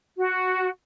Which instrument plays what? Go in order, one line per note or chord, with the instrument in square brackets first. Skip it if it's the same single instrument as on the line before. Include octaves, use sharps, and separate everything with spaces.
[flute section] F#4